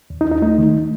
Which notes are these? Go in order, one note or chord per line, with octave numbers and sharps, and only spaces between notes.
D#2
D#4
D#2
D#4
A3 D#4
D#3
A3